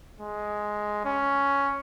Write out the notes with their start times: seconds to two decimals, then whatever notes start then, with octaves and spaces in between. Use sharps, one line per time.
0.20 G#3
1.05 C#4